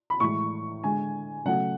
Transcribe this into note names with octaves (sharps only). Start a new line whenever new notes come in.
B5
A2 E3 G#3 C#6
D3 G#3 G#5
C#3 F#3 A3 F#5